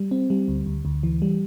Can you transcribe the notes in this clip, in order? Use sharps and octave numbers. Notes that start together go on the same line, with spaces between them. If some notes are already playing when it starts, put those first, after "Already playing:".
Already playing: G3
C4
G3
D2
D2
D2
E3
G3